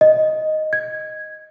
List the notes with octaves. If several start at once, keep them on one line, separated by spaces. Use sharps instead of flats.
D#5
G#6